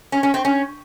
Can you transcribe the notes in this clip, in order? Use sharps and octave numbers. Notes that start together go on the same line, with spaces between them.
C#4
C#4
C4
C#4